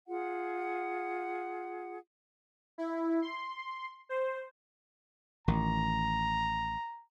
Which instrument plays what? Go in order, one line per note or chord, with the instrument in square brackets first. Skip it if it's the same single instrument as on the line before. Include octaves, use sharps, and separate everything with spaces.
[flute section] F4 G#4 F#5
[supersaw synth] E4
C6
C5
[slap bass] A1 D#3 [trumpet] A#5